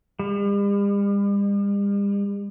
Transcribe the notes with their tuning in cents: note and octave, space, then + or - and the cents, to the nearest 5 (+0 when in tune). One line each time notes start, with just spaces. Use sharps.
G3 +45